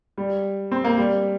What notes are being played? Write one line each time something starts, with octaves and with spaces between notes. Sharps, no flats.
G3
C4
A#3
G3